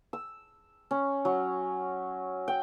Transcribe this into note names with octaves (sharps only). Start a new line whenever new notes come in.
E6
C#4
F#3
G5